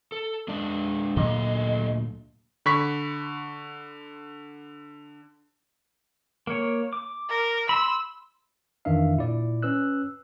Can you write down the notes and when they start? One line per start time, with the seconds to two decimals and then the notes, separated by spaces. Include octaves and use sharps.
0.12 A4
0.48 G#3 D4 D5
1.16 D2 A#2 F#3 A3 D#5
2.66 D3 B5 C#6 B6
6.47 A#3 C#5
6.93 D6
7.29 A#4
7.69 B5 C6 E6
8.85 F2 D#3 E3 D4 E5 F5
9.17 A#2 E4 D5
9.62 C#4 B4 E6 F#6